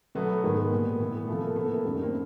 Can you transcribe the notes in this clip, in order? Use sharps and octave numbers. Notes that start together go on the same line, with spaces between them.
B2 F#3 A3 B3
G#2 D#3 G#3
A#2 G3
A2 E3 A3
C3 F3 A3
A#3
A2 E3 A3 B3
A#3
A3
F#2 D#3 G3 A#3
A#3 C4